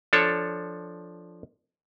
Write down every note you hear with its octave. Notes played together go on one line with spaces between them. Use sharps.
F3 D4 A4 C#5